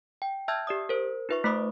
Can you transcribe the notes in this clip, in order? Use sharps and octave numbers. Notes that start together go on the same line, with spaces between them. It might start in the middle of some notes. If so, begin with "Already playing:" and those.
G5
E5 A5 E6 F6 G6 G#6
G4 D5 D#6
A#4 C5
D#4 F4 B4 E5 C#6
A3 D#4 C5 B5 D6 D#6